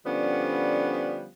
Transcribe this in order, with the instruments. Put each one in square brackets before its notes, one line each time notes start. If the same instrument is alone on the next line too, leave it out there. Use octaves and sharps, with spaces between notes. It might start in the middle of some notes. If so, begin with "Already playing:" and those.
[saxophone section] D3 F3 G3 B3 C#4